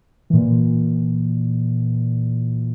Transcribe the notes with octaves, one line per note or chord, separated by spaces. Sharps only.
A#2 E3